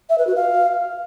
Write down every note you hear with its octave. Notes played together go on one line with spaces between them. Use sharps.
E5
B4
F#4
F5